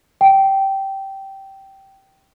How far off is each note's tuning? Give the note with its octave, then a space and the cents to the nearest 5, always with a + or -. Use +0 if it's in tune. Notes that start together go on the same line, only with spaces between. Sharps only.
G5 -15